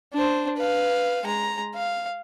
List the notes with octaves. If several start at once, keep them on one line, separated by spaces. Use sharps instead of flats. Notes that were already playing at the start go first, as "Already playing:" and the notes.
D4 C5
B4 F5
G#3 A#5
F5